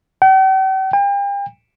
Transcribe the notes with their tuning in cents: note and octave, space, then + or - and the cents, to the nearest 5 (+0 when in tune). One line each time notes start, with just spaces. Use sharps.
G5 -45
G5 +40